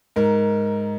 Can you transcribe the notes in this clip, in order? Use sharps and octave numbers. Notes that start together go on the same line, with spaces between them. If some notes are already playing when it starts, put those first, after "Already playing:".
G#2 A#4